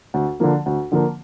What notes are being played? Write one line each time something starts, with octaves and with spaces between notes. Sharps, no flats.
D2
D3 F3 A#3
D2
D3 F3 A#3